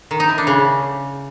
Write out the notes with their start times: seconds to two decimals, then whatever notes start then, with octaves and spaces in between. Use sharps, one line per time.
0.11 D#3
0.20 D#4
0.29 E4
0.38 D4
0.47 C#3